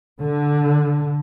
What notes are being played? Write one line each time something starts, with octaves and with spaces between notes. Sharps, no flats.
D3